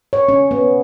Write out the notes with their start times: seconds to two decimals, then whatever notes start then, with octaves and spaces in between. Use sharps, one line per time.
0.13 C#5
0.29 C#4
0.51 B3